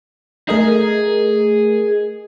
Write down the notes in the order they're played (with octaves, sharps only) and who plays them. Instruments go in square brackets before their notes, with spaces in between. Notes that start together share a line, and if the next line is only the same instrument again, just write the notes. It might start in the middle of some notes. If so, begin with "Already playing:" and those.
[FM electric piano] A3 A#4 D#5 [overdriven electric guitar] G#4